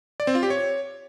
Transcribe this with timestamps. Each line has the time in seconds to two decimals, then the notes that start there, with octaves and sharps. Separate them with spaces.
0.20 D5
0.27 C4
0.35 F4
0.43 G4
0.50 C#5